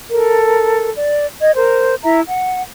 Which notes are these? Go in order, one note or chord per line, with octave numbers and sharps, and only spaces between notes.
A4 A#4
D5
D#5 G#6
A#4 C5
E4 E5 A#5
F#5